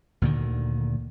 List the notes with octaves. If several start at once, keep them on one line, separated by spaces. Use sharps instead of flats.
D2 A#2 D3 D#3